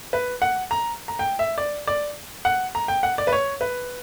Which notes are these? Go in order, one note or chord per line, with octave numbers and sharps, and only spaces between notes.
B4
F#5
A#5
A#5
G5
E5
D5
D5
F#5
A#5
G5
F#5
D5
B4
C#5
B4